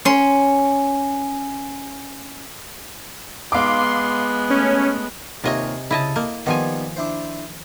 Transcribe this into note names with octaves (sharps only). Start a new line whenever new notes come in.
C#4 C6
G#3 B3 F5 C6 D6
A3 C#4
D#2 C3 F4 C#5 D#5 G#5
C#3 E4 D#5 A5
A#3 D#5
D#3 F3 G3 B3 D#4 G#5
D4 E4 C5